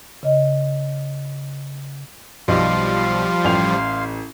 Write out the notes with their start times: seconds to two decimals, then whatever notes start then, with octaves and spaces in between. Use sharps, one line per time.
0.23 C#3 D#5
2.48 B1 F3 G3 F5 C6
3.44 A1 G5 F7